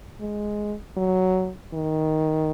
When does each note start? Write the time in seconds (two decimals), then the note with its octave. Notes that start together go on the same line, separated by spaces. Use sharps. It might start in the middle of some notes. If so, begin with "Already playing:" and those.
0.21 G#3
0.97 F#3
1.74 D#3